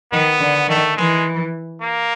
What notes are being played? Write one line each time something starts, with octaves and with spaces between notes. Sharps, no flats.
D#3 B3
D3
D#3 A3
E3 G#3
A#3